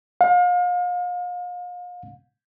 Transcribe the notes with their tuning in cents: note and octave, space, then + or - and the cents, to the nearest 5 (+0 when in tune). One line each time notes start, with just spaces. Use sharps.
F5 +35